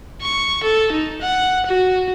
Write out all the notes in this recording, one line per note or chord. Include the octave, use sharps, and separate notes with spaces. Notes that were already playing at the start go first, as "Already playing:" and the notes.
C#6
A4
D#4
F#5
F#4